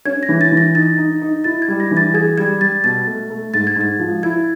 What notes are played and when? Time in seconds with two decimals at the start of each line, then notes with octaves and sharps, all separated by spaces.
0.05 C#4 G#6
0.23 A#6
0.29 E3
0.41 A6
0.52 E3
0.57 A#6
0.75 D#4 A6
0.98 D#4
1.21 D#4
1.44 E4 A6
1.62 G#6
1.68 G3
1.80 A#6
1.91 E3
1.97 A6
2.14 G#4 G#6
2.38 G3 G#6
2.61 G3 A6
2.84 B2 A6
3.07 A3
3.30 A3
3.54 G#2 A6
3.67 G#6
3.76 G#2 A6
3.99 F3
4.23 E4 G#6